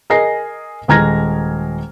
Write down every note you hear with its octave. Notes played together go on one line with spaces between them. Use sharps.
G#4 A#4 D#5 A#6 C7
D#1 G#3 A#5 F6 G#6 A#6